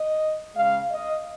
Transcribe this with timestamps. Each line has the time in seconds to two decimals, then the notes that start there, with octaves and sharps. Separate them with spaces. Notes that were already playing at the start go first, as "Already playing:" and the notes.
Already playing: D#5
0.55 C#3 G#3 F5
0.91 D#5